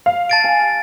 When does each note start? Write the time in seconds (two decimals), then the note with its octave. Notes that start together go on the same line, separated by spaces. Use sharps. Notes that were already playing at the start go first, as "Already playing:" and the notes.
0.06 F5
0.30 A5 A6 D7
0.44 G#5